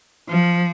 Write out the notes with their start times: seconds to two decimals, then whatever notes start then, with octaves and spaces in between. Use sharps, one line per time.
0.29 F3